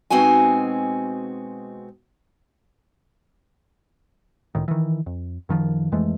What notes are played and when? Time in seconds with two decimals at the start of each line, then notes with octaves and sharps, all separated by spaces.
0.10 B2 G#3 C4 D#4 F#4 G#5
4.55 C#2 A2 D#3
4.68 D#3 E3
5.06 F2
5.49 F#2 D#3 F3
5.92 F2 E3 G#3 A3